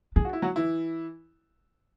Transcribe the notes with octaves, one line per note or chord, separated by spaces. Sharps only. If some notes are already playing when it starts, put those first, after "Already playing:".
D4 G#4
F#4
E4
F#3 F#4
E3 E4